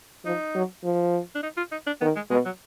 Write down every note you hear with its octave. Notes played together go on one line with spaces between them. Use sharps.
F3 D#4
F#3
F3
D4
D#4
F4
D#4
D4
D#3 B3
G#3
B2 G#3
F#3